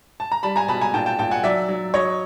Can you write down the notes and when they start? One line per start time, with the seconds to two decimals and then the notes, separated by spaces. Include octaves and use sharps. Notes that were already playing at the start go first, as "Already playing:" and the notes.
0.20 A5
0.32 A#5
0.43 G3 A5 B5
0.56 G#5 A#5
0.68 B2 A5 B5
0.81 G#5 A#5
0.94 A#2 G5 A5
1.06 G5 A5
1.19 A#2 G5 A5
1.31 F#5 G#5
1.43 F#3 D5 E5
1.69 F#3
1.94 F#3 C#5 D#5